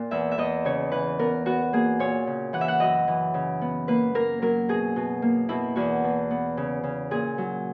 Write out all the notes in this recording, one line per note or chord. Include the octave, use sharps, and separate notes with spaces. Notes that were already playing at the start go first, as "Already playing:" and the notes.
Already playing: A#2
E2 E5
E5
E2 D#5
C#3 C#5
E3 B4
B3 A#4
B3 F#4
A#3 G#4
A#2 C#5
C#3
E3 F#5
E5
F#5
F#2 D#5
E3
C#3
B3
A#3 B4
A#3 A#4
F#3 A#4
B2 G#4
B2
A#3
B2 E4
E2 F#4
B2
B3
C#3
C#3
A#2 G#4
F#3